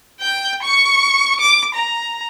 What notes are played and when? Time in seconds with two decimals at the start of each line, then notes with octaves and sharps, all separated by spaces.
0.20 G5 G6
0.63 C#6 C#7
1.40 D6
1.75 A#5